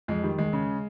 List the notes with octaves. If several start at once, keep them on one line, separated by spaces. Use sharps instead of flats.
F2 G#3
D#3 G3
D#2 G#3
C#3